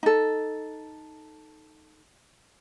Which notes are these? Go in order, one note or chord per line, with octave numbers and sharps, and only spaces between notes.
D#4 A4